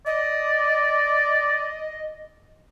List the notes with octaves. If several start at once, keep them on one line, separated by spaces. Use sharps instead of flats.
D5 D#5